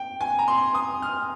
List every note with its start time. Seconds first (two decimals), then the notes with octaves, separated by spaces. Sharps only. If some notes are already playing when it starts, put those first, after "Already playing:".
Already playing: G5
0.21 G#5
0.39 A#5
0.48 C6
0.74 D#6
1.02 F6